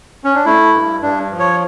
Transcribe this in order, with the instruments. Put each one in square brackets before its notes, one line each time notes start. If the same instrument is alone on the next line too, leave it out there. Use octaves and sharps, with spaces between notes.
[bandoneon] C#4
D4
A3 E4
G2
G2 D4
F3
C#5